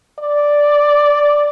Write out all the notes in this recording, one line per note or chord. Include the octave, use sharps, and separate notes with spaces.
D5